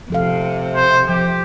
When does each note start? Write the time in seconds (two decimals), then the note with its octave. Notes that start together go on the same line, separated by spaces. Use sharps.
0.10 C3 F3 A4 F5
0.75 C5
1.09 F3 G4